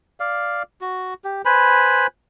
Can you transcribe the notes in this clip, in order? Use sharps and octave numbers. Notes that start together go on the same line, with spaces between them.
D5 F5
F#4
G4
B4 C5 G#5 B5